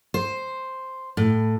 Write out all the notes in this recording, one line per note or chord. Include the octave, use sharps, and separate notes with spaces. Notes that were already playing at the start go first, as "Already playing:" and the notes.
C5
A2